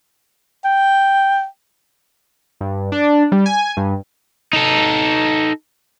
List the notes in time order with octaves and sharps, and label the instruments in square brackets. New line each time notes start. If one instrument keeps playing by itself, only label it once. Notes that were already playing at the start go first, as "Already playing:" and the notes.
[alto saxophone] G5
[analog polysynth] G2
D4
G3
G#5
G2
[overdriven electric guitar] D#4 A4